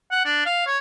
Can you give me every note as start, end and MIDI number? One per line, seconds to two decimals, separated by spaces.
0.11 0.21 78
0.25 0.45 62
0.46 0.65 77
0.66 0.78 73